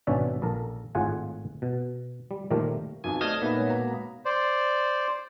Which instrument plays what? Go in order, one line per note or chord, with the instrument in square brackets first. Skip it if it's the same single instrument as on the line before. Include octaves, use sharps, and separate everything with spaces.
[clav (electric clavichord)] G#1 B2 C#4 D4 D5 E5
A#1 A4 A#4
G#1 A2 F4 G#4 F#5 G#5
B2
G3
A#2 D#3 F3 A3 G4 A#4
[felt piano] B1 F2 B2 [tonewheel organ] G#5
[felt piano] A3 G#6 E7 [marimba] C5 D5 [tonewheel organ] D#5 D#6 F6
[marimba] A#2 B5 [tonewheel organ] A#3 B3 [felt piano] D#4 B4 E5
[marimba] G#3 C#5
[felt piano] B2 A#5 [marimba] B4
[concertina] C5 D5